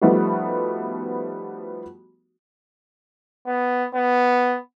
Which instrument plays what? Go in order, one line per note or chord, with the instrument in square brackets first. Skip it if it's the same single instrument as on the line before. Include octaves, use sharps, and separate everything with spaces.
[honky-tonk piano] F3 G3 A3 B3 D#4 F#4
[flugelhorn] B3
B3